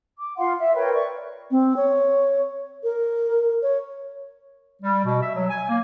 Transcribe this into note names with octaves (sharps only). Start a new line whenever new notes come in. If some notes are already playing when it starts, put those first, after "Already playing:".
D6
F4 F5 F#5 C6
E5
A#4 B4 C#5 G5
D5 C#6
C4
C#5
A#4
C#5
G3
B2
E5
F#3
G#5
A#3